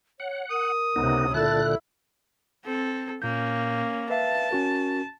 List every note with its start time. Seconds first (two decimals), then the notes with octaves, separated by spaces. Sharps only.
0.20 C#5 F#5
0.50 A#4 D#6
0.96 C#2 C3 B3 D#4
1.34 A#2 D3 E4 A4 A5 F#6
2.64 C4 A4
3.22 A#2 A#3 C#4 G6
4.10 B4 E5 F5 A5
4.51 C#4 F#4 A#4